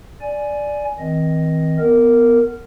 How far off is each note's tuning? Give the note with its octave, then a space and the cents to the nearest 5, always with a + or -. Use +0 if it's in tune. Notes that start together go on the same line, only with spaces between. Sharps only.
D5 +0 G#5 +10
D#3 +45 C4 +0 D#5 +5
B3 +0 A#4 -10